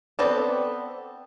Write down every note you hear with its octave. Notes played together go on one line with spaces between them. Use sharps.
B3 C4 A4 B4 D5